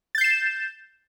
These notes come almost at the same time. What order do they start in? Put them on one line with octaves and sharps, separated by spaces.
A6 G6 C7 E7